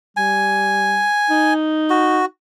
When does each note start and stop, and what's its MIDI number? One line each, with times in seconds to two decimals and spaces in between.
0.17 1.07 55
0.17 1.54 80
1.30 2.22 63
1.90 2.25 66